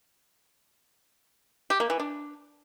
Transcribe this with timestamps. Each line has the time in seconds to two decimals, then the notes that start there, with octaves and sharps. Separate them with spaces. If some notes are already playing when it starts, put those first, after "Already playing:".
1.70 G4
1.80 A#3
1.90 E3
2.00 D4